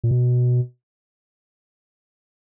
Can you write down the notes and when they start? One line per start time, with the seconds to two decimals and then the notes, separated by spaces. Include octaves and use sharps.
0.04 A#2
0.11 B2